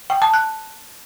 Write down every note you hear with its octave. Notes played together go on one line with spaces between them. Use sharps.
G5
A5
F#6